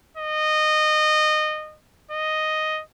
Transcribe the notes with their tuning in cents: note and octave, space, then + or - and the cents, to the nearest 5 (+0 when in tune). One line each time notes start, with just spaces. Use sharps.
D#5 -20
D#5 +0